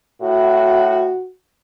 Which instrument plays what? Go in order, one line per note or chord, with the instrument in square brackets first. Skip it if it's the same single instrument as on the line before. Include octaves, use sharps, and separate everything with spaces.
[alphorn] A2 [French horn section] F#4